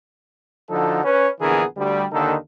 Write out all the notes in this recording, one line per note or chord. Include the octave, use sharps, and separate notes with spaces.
D3 F3 D#4 F#4 A4
C#4 B4
A#1 D3 E3 B3 G#4 A#4
D2 G3
D#2 D3 D#3 A#3 D#4 A4